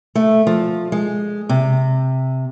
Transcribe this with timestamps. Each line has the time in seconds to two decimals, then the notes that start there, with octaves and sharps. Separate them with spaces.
0.15 A3
0.47 F3
0.92 G#3
1.49 C3